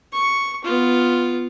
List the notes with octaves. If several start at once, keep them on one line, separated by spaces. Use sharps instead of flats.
C#6
B3 F4